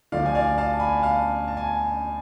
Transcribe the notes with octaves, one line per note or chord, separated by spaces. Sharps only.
D2 D3 F3 D5 F5
G#5
D5 F5
F5 A5
G#5 B5
F5 A5
A5
G#5